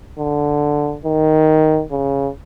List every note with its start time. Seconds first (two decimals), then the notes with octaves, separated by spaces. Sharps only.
0.19 D3
1.05 D#3
1.91 C#3